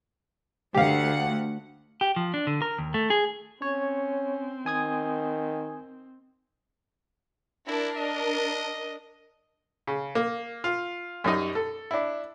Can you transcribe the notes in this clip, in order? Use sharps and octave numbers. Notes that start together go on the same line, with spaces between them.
D2 G4 F5 F#5
G4
F3
D4
D3
A#4
D#2
A3
G#4
C4 C#4 C#5
D#3 G#5 D#6 G#6
D4 E4 A#4
D#5
C#3
A#3
F4
F#2 G3 D#4 D#5
A4
D4 E4